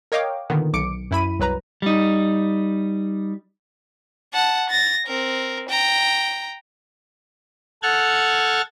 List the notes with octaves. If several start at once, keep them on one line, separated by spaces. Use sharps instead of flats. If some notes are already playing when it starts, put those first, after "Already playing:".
A#4 C#5 D#5 F5 G5 D6
A#2 D3 D#3 B3
B1 D6 C#7 D7
F#2 E4 B5 D#7
C2 F#3 B4 A#5
G3 D#4
F#5 A5
A6 A#6
C4 A#4
G5 A#5
A4 F#5 F6 F#6 G#6 A6